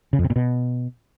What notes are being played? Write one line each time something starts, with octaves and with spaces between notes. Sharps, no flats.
C#3
F2
C3
A#2
B2